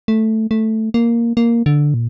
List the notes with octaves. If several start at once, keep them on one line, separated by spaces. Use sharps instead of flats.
A3
A3
A#3
A#3
D3
A#2